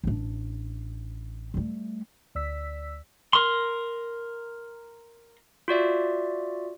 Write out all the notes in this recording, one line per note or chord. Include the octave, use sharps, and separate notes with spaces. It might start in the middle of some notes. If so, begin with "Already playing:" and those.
A1 D4
G3 A3
D2 D5 E6 B6
A#4 C6
F4 F#4 D5 E5